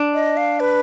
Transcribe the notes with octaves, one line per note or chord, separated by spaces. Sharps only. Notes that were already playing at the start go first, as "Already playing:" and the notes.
Already playing: D4
D#5
F5
B4